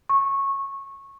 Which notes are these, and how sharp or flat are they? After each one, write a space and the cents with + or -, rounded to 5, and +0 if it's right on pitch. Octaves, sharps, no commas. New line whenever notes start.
C#6 -15